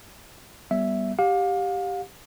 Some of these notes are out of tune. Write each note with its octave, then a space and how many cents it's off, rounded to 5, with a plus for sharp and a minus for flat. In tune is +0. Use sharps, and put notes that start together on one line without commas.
G3 +0 B3 -15 E5 +0
G4 +0 F5 +35